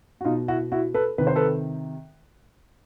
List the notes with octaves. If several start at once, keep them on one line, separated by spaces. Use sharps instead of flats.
F#4
B2 D#4 F4
E4 F#4
E4 F#4
A4 B4
C3 D#3 B4
C5
A4 B4